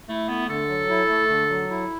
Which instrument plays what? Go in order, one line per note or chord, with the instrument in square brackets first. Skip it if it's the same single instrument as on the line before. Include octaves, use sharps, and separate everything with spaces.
[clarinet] A3 [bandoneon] E4
[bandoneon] A3 [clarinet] B3
[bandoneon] D3 [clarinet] A4
[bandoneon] F#3
E4
A3
D3
F#3
E4